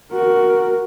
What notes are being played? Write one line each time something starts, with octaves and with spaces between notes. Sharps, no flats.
F#4 A#4